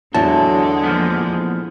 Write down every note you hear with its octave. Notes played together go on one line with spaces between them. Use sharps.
E2 D3 F#3 G#3 A5
A#2 F3 B3